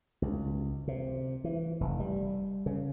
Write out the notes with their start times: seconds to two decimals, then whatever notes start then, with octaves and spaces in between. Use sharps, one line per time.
0.22 C#2
0.88 C3
1.44 E3
1.81 F1
2.00 G3
2.66 C#3